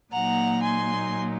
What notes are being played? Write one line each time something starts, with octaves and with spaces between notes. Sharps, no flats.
A#2 F#3 A#3 D#4 F#5 A#5
G#5 C6